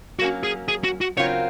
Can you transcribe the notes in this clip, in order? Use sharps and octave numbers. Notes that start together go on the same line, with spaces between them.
F#3 A#3 C#4 F#4
G#4
G#4
F#4
F#4
C#3 F#3 C4 F4 A#4 C#5